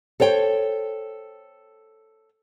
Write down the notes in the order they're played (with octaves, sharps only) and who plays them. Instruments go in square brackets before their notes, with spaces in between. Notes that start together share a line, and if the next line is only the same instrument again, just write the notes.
[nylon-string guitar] A4 C5 C#5 G5